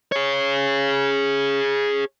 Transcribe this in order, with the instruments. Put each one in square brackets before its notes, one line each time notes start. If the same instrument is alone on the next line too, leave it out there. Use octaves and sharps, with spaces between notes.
[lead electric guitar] G#4 C#5